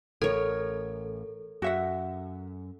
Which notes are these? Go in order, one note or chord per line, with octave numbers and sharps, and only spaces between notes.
A1 A4 A#4 C#5
F#2 F#4 E5 F#5